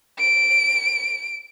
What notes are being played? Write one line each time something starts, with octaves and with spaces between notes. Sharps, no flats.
D7